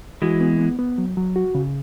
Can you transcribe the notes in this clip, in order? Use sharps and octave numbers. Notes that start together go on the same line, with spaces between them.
E3 G#3 F#4
B3
B3
B3
F#3
F#3
F#4
C#3